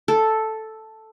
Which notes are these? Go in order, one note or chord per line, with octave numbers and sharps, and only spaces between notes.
A4